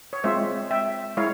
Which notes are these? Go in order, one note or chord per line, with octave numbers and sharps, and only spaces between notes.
C#5
G#3 C4 F4 C5 E5
E5 G5
G#3 E4 C#5 F5